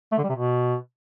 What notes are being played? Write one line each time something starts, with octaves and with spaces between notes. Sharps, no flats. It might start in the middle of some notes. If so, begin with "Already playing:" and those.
A3
D3
G3
C3
B2